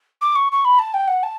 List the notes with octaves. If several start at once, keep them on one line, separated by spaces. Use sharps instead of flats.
D6
C#6
C#6
B5
A5
G5
F#5
A5